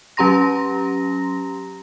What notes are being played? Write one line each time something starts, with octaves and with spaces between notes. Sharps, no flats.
F#3 C#4 G4 A#5 C6 A#6